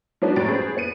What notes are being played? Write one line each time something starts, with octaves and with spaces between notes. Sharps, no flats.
F#3 G#3 B3 D4 D#4 F#4
F1 F#2 A2 G3 A6 D7
C4 C#4 G#4 B4
B3 C#7 D#7